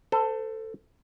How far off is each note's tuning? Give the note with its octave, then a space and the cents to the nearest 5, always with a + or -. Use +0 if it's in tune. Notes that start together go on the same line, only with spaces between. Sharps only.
A4 +15 C5 -30